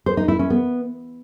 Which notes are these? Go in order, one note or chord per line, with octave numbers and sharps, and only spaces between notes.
C5
D#4
E4
C#4
B3